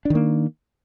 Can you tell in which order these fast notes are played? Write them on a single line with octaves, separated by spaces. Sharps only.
D4 D#3 A#3